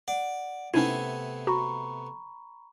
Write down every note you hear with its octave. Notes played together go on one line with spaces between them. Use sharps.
D5 F#5
C3 A3 B3 C#4 D#4 E4 G#6 D#7
F#4 A#5 B5 C#6